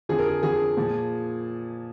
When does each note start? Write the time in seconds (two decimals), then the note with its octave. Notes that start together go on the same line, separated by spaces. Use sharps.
0.09 F2 D3 F3 G#4
0.19 A#4
0.28 G#4
0.42 F2 D3 F3 G#4
0.77 A#2 F3